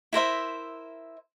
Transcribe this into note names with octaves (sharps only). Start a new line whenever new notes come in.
E4 A#4 C5 E5